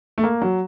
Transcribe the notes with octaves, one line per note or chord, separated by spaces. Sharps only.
A3
A#3
F#3